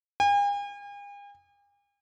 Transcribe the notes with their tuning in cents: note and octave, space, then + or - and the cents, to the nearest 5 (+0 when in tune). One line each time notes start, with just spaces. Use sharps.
G#5 -45